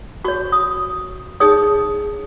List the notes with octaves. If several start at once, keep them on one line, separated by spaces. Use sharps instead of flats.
F#4 C#5 C#6
D#6
D#4 G#4 C#5 D#6